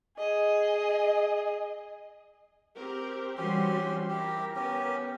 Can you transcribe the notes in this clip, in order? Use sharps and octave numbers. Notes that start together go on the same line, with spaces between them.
G#4 D#5
C4 G4 A#4
E3 G3 C4 C#4 F#4 G4 C6
E4 G4 A#4
B3 C#4 G4